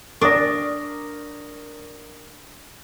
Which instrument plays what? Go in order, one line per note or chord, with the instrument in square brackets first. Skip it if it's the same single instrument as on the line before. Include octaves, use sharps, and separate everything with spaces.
[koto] D4 [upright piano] A#4 D5 [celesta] C#6 D#6 A#6